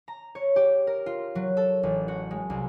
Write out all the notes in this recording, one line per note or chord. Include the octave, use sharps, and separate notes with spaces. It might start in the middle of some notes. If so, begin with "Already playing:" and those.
A#5
C#5
G4
A#4
F4
F#3
A4
A1
F#4
G#3
C2